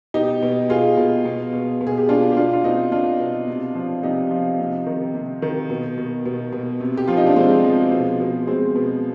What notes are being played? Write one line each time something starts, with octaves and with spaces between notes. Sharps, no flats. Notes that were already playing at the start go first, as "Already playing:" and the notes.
B2 D#4 G4
B2
B2 F4 G#4
B2
B2
B2
B2
G#4
G4
B2 D4 F4
G4
B2 D4 F4
F4
B2 C4 D#4
B2 D4 F4
B2
C3
F3
C3 D#4 G4
F3
C3
D#3
C3
D#3
B2
B2
B2
B2
C3
G4
F3 F4
D#4
D4
C3 G#3 C4
F3
B2
B2
B2 G#3 C4
B2